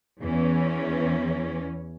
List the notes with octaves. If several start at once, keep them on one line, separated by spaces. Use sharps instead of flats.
E2 E3 C#4